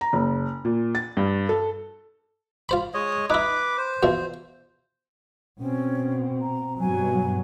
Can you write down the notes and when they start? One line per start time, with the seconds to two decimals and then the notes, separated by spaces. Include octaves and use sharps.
0.01 A#5
0.13 F#1
0.65 A#2
0.95 A6
1.17 G2
1.49 A4
2.69 F4 C5 B5
2.94 G#3 C#5 D#5
3.30 D#4 E4 B4 D6
3.78 C5
4.03 E2 B2 F3
5.59 B2 C4 C#4
6.41 A#5
6.80 G2 B2 F#3 G#5